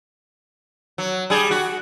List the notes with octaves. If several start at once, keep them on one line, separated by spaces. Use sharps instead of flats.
F#3
G3 G#4
F#4